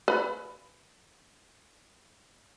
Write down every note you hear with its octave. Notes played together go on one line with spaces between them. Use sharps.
B4 B5